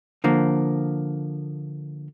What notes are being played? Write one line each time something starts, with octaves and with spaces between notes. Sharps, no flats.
D3 F3 A#3